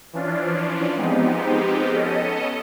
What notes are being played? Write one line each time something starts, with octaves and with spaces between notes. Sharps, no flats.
E3 F3 C#4 D4 F4
F3 G#3 B3 C4 D#4 G4
B3 C#4 A4 D#5